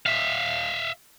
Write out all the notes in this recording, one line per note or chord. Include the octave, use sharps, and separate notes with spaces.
E5 F5